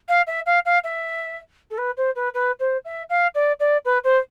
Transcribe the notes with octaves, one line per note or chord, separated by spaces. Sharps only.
F5
E5
F5
F5
E5
A4
B4
C5
B4
B4
C5
E5
F5
D5
D5
B4
C5